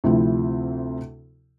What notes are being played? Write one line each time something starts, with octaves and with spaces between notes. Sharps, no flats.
D2 C3 F3 C4 E4